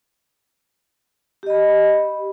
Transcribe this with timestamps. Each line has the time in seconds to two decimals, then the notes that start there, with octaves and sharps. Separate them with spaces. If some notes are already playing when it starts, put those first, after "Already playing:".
1.43 G4
1.46 D#5
1.50 B5